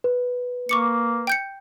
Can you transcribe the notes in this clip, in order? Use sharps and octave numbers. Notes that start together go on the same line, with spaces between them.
B4
A#3 C#6 D6 C#7
G5 G6 C#7